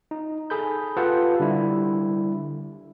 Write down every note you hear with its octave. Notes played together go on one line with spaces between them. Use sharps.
D#4
G#4 A4 B5 G6
F4 G4 A4 B4 F#5
D3 G3 E4